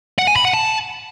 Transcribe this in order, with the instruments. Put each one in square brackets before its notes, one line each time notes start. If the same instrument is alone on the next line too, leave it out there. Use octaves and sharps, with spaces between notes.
[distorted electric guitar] F#5
G#5
B5
F#5
A5